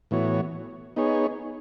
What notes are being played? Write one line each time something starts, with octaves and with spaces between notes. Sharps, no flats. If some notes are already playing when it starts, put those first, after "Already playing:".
A2 E3 B3 F#4 C#5
B3 D#4 G#4 C#5